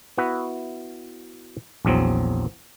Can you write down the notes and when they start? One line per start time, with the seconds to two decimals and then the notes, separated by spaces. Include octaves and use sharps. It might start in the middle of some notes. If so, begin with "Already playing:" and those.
0.18 B3 E4 F#4 B4
1.85 A#1 E2 F#3 C4